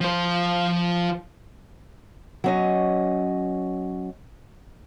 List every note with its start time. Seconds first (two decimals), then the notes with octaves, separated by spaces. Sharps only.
0.01 F3 C5
2.44 F#3 C#4 D#5